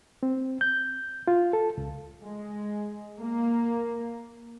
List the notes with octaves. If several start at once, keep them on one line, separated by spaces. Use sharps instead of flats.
C4
G6
F4
A4
C#2
G#3
A#3